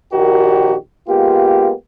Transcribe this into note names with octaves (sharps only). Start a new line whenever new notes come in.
A#1 A#2 D#3 F#4 G4 A#4
G#3 A#3 B3 F4 G4